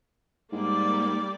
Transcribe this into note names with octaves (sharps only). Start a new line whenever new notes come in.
G#2 G3 A#3 D5